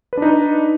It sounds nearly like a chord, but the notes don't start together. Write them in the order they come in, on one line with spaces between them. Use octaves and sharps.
B4 D4 D#4